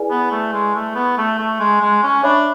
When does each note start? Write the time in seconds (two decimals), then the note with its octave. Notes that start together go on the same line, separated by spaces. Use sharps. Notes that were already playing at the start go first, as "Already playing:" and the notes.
Already playing: E4 G#4 B4 D5 G#5
0.10 B3
0.32 A3
0.53 G#3
0.75 A3
0.95 B3
1.18 A3
1.39 A3
1.60 G#3
1.81 G#3
2.03 C#4
2.23 D4 C#5 E5 B5 D6